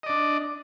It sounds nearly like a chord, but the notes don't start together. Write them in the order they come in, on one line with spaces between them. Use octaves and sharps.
D#5 D5 D4